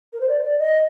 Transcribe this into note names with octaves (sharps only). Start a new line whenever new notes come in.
A#4
C5
D5
C5
D5
D#5